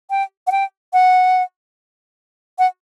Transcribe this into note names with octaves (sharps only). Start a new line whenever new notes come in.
G5
F#5
G5
F#5
F#5